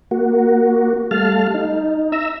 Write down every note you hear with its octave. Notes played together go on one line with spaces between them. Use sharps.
A#3 F#4
G3 A3 F5 A5 F6
D#4
E5 A#5 E6